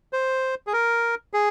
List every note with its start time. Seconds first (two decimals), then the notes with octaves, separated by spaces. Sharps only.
0.13 C5
0.67 G#4
0.73 A#4
1.34 G#4